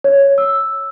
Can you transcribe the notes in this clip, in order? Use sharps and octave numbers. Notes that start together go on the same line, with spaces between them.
C#5
E6